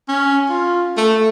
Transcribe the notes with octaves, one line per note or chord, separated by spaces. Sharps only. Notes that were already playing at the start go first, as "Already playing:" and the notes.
C#4
F4
A3